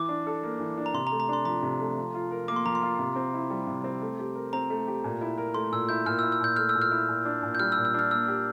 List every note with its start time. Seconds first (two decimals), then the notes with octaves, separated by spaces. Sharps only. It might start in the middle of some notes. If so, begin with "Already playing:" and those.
Already playing: E3 D6
0.09 D4
0.26 A4
0.43 A#3
0.60 E3
0.77 D4
0.86 A#5
0.94 C3 C6
1.07 A#5
1.11 A3
1.20 A#5
1.28 D4 C6
1.45 F3 A#5
1.63 C3
1.80 A3
1.96 F3
2.14 F4
2.31 A#4
2.48 A#3 D6
2.56 C6
2.65 F3 A#5
2.75 C6
2.82 F4
2.99 C3
3.16 C4
3.34 E4
3.50 G3
3.67 C3
3.84 C4
4.01 A3
4.19 G4
4.35 A#4
4.53 C4 A#5
4.70 A3
4.87 G4
5.04 A#2
5.21 E4
5.38 A#4
5.54 A3 C6
5.72 A#2 E6
5.89 E4 G6
6.06 A#2 F6
6.19 E6
6.23 E4
6.32 E6
6.41 A#2 G6
6.56 A3 F6
6.69 E6
6.75 A#2
6.82 F6
6.91 E4
7.09 A#2
7.25 D4
7.43 A#2
7.55 G6
7.60 G3 F6
7.72 E6
7.77 A#2
7.85 E6
7.94 D4 F6
8.11 A#3 E6
8.28 G4